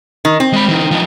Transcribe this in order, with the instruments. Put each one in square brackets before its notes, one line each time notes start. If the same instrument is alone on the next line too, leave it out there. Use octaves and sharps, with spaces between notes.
[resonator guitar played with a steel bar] D#3
C4
[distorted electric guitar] G#3 B5
E3 D#4
F3 D#4